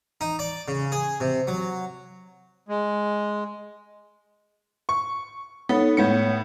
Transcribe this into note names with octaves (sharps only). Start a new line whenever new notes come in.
D#4
D5
C#3
G#4
C3
F#3
G#3
C#6
B3 D#4 A4 C#5
A2 B3 C#5 C#7